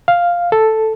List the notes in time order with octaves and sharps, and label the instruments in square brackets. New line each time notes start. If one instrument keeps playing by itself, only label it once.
[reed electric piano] F5
A4